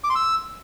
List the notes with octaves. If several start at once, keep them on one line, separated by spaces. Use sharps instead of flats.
D6
C6
E6